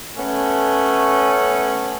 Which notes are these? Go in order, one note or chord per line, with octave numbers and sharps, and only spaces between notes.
A3 B3 C#4